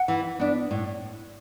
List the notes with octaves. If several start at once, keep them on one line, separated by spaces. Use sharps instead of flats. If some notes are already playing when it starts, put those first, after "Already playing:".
Already playing: F#5
E3
B3 D4
A2